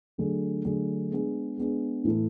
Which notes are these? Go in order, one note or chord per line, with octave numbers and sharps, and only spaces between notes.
D3 F#3 A3 D4 G#4
D3 F#3 A3 D4 G#4
G#3 B3 D4 G#4
G#3 B3 D4 G#4
A2 E3 A3 E4 A4